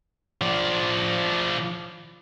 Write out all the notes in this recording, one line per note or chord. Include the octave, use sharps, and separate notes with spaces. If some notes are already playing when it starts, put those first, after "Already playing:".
F3 D5